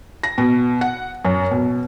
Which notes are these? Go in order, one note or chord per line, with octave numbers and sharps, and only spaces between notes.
A#6
B2
F#5
F#2
B2